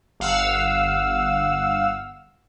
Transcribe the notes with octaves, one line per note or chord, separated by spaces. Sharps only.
G1 F5 F#5 E6